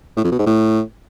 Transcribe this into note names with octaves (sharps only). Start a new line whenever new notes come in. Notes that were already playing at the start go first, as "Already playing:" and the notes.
A2
F2
B2
G#2
A2